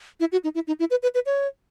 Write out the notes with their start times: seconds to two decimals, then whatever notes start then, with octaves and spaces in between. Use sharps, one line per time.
0.20 E4
0.32 F#4
0.44 D#4
0.55 E4
0.67 D#4
0.80 E4
0.91 B4
1.03 B4
1.14 B4
1.26 C#5